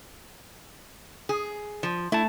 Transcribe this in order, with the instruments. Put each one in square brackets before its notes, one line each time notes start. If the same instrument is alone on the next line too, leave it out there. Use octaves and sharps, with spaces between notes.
[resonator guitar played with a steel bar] G#4
F3
[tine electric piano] A3 A5 [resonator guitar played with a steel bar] E4